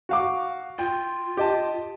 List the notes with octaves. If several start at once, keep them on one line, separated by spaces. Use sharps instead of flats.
F#4 F5 D6
F4 G5
G4 D#5 A5